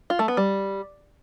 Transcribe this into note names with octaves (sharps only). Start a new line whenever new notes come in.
F4
A3
B3
G3